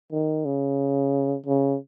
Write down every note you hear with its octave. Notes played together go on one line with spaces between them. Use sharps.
D#3
C#3
C#3